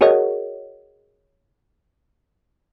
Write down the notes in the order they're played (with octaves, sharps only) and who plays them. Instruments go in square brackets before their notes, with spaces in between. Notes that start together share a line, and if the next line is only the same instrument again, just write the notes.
[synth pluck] F#4 G#4 A#4 C#5 D#5 F#5